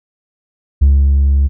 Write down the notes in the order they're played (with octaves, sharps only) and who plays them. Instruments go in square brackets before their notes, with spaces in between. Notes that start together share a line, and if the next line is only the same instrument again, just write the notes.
[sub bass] C#2